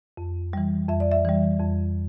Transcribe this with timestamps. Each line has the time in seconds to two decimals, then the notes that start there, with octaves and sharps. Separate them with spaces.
0.17 F2
0.53 E3 G3
0.89 F2 E5
1.00 D5
1.11 E5
1.25 E3 G3
1.60 F2